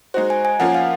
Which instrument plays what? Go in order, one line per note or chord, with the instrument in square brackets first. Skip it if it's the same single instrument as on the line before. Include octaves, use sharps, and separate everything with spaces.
[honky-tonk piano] G#3 D#4 F#4 [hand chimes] C5
[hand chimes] G#5
G#5
[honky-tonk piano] F3 A#3 C#4 F4 A#4 [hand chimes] F#5
[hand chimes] F5